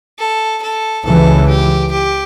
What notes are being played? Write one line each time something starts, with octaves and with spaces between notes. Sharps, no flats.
A4
A4
C#2 C#3 E3 A4
G4
G4